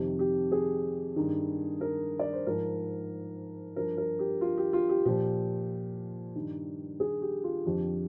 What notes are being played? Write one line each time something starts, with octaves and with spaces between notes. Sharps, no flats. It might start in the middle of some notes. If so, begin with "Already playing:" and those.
Already playing: F2 C3 D#3 G4
G4
G#4
G2 D#3
A#4
D5
C5
G#2 F3 A#4
G2 F3 A#4
A#4
G4
F4
G4
F4
G4
A#2 F3 G4
G2 D#3
G#4
G4
F4
F2 D3 F3 G4